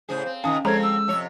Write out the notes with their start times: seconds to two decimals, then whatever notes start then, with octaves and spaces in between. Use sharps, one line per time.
0.09 A2 C#3 G#4 C5
0.26 C4
0.44 C3 D#3 C#4 F5 G#5 D#6
0.65 F3 G#3 C4 C#4 A4 C5 C#5 A#5
0.82 E6
1.08 F2 C3 C#5